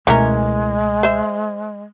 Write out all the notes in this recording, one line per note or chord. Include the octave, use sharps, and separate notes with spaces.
C#2 B2 E3 G#3 A3 C#4 A#4
C5 E5